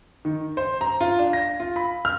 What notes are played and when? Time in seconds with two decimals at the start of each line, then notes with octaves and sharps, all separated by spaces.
0.25 D#3
0.57 C5
0.81 A#5
1.01 F4
1.19 D4
1.33 A#6
1.60 F4
1.76 B5
2.05 F6